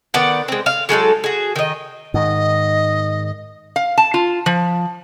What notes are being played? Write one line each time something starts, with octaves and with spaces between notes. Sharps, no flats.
D#3 B3 D5 F#5
G#3 C4
F5
F#3 G#3 D#4 A4
F#4 G#4
D#3 D#5
G#2 D#3 D#5
F5
A5
F4
F3